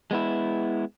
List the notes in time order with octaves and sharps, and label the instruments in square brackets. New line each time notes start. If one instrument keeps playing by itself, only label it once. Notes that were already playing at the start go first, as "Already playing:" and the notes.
[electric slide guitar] G#3 B3 E4